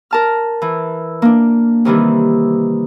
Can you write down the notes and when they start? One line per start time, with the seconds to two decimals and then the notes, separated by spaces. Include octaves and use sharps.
0.11 A#4 A5 F6
0.62 E3
1.22 A#3 D4
1.85 C3 D#3 E3 G3